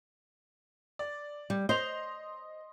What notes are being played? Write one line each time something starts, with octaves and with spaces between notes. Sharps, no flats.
D5
G3
C5 D#5 C6 F7